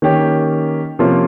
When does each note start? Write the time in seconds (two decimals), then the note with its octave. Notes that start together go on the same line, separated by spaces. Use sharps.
0.02 D#3 A#3 C#4 G4
0.99 C3 F3 A#3 C#4 F4